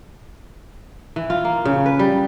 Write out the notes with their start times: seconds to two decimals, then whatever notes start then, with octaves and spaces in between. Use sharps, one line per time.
1.16 E3
1.30 F4
1.45 A#3
1.65 C#3
1.86 B4
1.99 G3